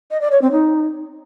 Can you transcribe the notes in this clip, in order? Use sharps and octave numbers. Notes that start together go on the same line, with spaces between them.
D#5
D5
C#5
C4
D#4